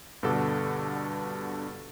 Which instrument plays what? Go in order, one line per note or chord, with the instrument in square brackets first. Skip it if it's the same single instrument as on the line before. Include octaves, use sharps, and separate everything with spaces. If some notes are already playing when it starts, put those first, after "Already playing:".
[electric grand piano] G2 B2 D3 A4 F#5 D6